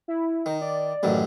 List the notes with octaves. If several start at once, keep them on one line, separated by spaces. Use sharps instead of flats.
E4
D#3 D#4
D5
A1 F#2 D#3